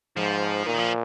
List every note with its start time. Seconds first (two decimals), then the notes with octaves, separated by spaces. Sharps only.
0.17 G#2 F3
0.66 A#2 D#3
0.79 F3